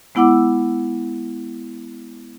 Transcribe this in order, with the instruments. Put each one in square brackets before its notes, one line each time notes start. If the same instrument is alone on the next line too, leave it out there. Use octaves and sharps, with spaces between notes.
[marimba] G#3 B3 E4 F#5 D6 E6